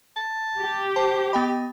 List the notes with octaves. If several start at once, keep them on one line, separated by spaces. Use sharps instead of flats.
A5
G4
C5 A5
B3 D#5 G5 B5